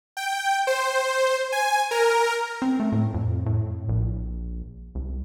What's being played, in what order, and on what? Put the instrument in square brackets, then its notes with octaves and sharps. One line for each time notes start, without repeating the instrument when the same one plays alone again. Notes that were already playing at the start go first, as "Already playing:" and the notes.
[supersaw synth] G5
C5
G#5
A#4
[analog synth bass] C4
A3
A2
F2
A2
A#1
C2